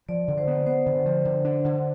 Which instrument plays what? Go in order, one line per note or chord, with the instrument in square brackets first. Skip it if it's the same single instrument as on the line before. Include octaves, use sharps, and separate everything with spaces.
[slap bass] F3 [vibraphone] D5
[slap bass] D3
[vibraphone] C5
[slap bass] B3
[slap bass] B3 [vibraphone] C5
[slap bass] D3
F3
D3
D4
D3